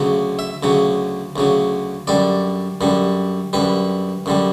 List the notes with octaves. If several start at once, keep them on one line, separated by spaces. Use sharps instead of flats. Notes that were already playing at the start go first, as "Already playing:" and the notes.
Already playing: D2 C#3 F#3
E5
D2 C#3 F#3
D2 C#3 F#3
F#2 D3 G3 D5
F#2 D3 G3
F#2 D3 G3 B4
F#2 D3 G3